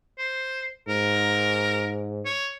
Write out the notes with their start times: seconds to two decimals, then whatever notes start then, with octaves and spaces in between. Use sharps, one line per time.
0.18 C5
0.88 G#2 A#4
2.26 C#5